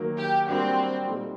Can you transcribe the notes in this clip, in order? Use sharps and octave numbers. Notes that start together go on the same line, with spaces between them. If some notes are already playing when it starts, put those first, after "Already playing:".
Already playing: D#3 F#3 A#3
G4
G3 A#3 C4 D4 F#4
A#2 G3 C4 D#4 A4